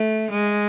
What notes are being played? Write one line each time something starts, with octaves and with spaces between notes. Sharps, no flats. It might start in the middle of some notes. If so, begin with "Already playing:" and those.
Already playing: A3
G#3